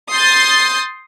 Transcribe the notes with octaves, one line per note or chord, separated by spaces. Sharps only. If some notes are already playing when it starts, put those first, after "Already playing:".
C6 D#6 G6 A6